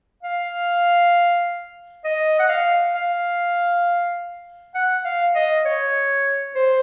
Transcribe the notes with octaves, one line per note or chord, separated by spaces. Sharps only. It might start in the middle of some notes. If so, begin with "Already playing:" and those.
F5
D#5
F#5
F5
F5
F#5
F5
D#5
C#5
C5